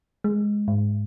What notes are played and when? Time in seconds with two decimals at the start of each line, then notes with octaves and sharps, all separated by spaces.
0.24 G#3
0.68 G#2